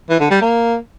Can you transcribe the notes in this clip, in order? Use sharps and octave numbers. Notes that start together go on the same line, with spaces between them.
E3
D3
G3
A#3